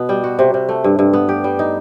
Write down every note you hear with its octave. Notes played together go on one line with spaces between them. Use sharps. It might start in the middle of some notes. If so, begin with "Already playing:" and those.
Already playing: B2 B3
G3
F#4
C3
C3
A3
G2
G2
B3
G4
G3
D#4